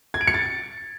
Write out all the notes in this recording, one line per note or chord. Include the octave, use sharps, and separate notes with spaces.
G#6
D7
C#7
A6